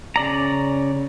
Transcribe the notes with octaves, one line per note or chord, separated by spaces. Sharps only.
C#3 D5 A#5